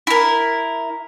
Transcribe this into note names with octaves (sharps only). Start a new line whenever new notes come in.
E4 A#4